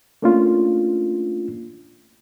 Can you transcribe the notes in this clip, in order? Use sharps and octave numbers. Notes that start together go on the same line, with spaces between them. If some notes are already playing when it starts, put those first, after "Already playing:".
A3 A#3 C#4 D4 F4